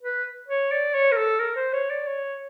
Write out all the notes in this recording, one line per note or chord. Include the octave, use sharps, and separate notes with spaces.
B4
C#5
D5
C#5
A#4
A4
A#4
C5
C#5
D5
C#5